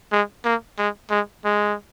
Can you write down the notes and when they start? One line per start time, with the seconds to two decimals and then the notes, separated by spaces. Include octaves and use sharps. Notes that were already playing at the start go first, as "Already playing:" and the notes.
0.12 G#3
0.45 A#3
0.78 G#3
1.10 G#3
1.45 G#3